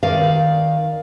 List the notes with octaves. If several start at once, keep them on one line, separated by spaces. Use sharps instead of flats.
D#3 D5 F5